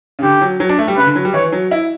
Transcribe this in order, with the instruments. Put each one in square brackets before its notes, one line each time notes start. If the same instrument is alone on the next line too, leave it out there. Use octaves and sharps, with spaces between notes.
[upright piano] C#3
[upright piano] D3 [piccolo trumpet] G4
[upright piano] F#3
F#3
D4
A3
G3
[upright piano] C#3 [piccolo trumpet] B4
[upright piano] D3
F#3
G3
[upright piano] E3 [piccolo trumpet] C#5
[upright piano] F#3
E4